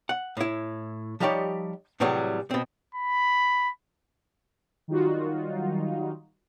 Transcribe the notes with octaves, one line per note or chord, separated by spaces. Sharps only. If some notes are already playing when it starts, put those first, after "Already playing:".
F#5
A2 E4
F3 G3 D#4 G4 C#5 D5
A2 C3 E3 F#3 G3 G#4
B2 C4
B5
D#3 F#3 G3 D#4 F4 F#4